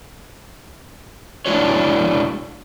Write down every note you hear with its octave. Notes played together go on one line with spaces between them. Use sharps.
G#3 D4 E4 F#4 C#5